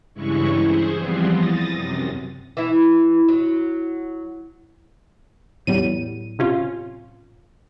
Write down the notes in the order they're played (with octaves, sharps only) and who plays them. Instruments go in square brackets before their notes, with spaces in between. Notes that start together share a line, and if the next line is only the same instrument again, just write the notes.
[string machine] G2 C#3 E3 G#3 E4 C#6
G#4 C5
E3 F3 G3 B3 C4
D#6 A6 A#6
F#2 C3
[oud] E3 E4
F#3
[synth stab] E2 G3 D#7 [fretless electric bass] A2 F#3 B3
[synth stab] C3 C#4 F4